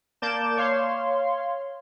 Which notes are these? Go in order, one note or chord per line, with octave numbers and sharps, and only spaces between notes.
A#3 D5 A5 D6 G6 E7
C#5 F5 C6